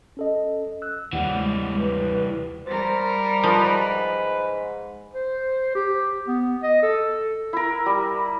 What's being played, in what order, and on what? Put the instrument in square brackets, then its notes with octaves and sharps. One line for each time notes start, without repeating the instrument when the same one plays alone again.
[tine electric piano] C#4 A4 D#5
E6 F#6
[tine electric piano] D#2 [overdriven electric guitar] E3 G3 [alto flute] F#5
[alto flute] G#3
B4
[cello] G3 A#4 [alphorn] C5
[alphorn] G#2 [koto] F3 [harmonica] B4
[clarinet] C5
G4
B3
D#5
A4
[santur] E4 A#4
G3